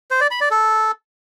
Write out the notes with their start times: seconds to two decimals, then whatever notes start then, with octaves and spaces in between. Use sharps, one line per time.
0.11 C5
0.21 D5
0.31 B5
0.41 D5
0.51 A4